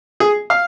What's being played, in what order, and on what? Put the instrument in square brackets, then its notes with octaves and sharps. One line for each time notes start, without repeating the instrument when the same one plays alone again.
[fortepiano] G#4
F5